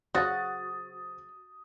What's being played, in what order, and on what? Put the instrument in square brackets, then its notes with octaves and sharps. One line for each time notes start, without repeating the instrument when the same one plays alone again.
[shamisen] C#3 F#3 [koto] F#4 [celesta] C5 [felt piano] D#6 A6